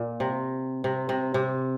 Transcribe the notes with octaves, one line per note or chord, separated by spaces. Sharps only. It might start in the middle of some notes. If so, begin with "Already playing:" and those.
Already playing: A#2
C3
C3
C3
C3